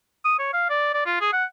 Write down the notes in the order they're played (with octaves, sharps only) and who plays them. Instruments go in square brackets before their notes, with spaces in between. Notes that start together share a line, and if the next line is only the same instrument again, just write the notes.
[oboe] D#6
C#5
F5
D5
D5
F4
G#4
F#5